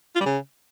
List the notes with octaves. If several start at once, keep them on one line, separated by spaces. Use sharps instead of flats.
F4
G3
C#3